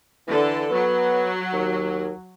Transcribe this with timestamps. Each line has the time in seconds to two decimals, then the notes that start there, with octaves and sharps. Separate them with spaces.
0.27 D3 E3 A4
0.70 F#3 B3
1.53 D#2